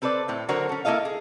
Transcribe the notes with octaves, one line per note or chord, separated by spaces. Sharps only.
C4 A4 B4 C5 D5
A2 C4
D3 F#3 F#4 A#4 C5 C#5
C#4 A4
A#3 E4 A4 D#5 F5
G#4